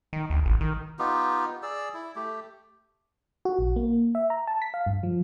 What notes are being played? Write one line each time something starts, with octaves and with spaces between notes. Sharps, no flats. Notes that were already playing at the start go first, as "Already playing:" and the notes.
D#3
D2
A1
D#3
B3 D#4 F4 G4
G#4 D5 E6
E4
A3 G4
F#4
A#1
A#3
E5
A#5
A5
B6
F5
G2
F3